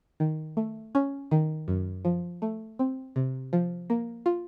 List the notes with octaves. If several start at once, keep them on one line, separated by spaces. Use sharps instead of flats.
D#3
A3
C#4
D#3
F#2
F3
A3
C4
C3
F3
A#3
F4